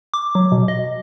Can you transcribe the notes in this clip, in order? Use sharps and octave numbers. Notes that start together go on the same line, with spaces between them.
D6
F#3
B2
D#5